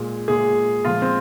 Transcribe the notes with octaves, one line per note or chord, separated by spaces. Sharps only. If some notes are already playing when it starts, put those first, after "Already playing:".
Already playing: A#2 G#3
A#2 G#3 G#4
A#2 F3 G#3 F4
C4